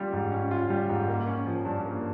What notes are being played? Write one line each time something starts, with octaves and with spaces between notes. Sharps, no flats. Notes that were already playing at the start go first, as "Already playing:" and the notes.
Already playing: G3 C#4 F4
G#2
C#4
F4
G3
G#2
A#3
C#4
F3
G2
A#3